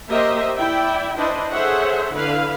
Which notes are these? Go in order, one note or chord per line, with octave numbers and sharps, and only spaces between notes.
A#3 G4 A#4 C5 D#5 E5
E4 D5 E5 G5
D4 E4 B4 C5 D#5
G#4 A4 C5 C#5 E5 F#5
D3 E4 B4 F5